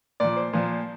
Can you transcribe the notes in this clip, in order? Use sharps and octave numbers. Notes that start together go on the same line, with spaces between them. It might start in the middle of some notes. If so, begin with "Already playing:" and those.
A#2 F3 D5
C5
A#2 F3